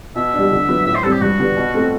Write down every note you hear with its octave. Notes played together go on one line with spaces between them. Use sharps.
B2 E5
G3 D4
D3
F#3 B3
A2 E5
C5
G3 C4 A4
G4
G2 F#4
D3 G3 B3 D4
B2
A3 C4